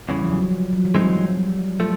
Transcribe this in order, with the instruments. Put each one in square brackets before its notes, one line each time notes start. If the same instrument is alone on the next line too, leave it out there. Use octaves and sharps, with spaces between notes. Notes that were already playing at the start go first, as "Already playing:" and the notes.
[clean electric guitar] E2 C#3 E3 [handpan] G3
[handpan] F3
F#3
F3
F#3
F3
[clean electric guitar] G2 E3 G#3 C4 D#4 [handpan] F#3
[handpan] G3
[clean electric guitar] F3 A3 [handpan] F#3